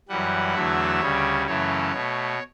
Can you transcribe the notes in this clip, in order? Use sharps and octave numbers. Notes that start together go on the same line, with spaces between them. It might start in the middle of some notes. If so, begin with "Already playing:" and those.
F#2 E3 G3 F#5
E2 D3 F#3 A3 E5
D2 C#3 G3 C#5
F#2 C#3 E3 A3 C#5
B2 A3